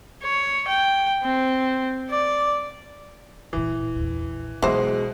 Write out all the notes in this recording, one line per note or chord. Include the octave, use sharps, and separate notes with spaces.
C#5
G5
C4
D5
D1 A#2 E3
A#1 E2
B2 E3 F#3 G#3 B3 C5